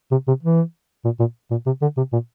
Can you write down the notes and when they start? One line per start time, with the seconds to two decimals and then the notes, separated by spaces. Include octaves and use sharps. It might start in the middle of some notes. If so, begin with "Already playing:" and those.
0.11 C3
0.28 C3
0.43 E3
1.05 A#2
1.20 A#2
1.51 A#2
1.66 C3
1.82 D3
1.97 C3
2.13 A#2